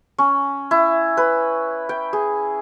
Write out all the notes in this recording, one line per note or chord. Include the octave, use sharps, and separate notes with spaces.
C#4
E4
B4
G5
G#4